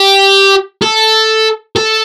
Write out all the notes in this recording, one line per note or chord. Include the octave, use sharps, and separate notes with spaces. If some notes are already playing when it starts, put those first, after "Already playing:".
Already playing: G4
A4
A4